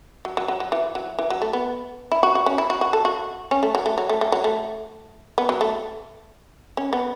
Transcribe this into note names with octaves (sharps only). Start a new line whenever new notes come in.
F#3
F#3
F#3
F#3
E3
F#3
E3
F#3
A3
B3
E4
F#4
F#4
C#4
E4
F#4
F#4
A4
F#4
C#4
A3
F#3
A3
F#3
A3
A3
F#3
A3
B3
F#3
A3
C#4
B3